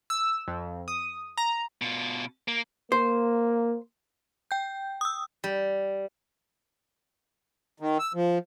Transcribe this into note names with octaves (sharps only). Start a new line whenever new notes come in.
E6
F2
D#6
A#5
B2 F4
A#3
A#3 C5
G5 G6
D#6 E6
G3
D#3
E6
F3